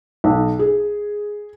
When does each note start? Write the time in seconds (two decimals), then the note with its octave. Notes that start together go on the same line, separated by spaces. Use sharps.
0.24 B1
0.59 G#4